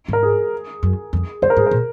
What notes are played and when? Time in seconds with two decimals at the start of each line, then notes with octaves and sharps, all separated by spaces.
0.08 G#2 A#4
0.23 G#4
0.83 F#2
1.13 F2
1.42 F#2 C5
1.50 A#4
1.57 G#2 G#4
1.66 A#2 A#4